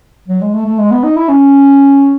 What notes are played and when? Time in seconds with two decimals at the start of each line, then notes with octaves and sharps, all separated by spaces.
0.28 F#3
0.41 G#3
0.54 A3
0.66 A3
0.79 G#3
0.91 B3
1.03 D#4
1.16 E4
1.29 C#4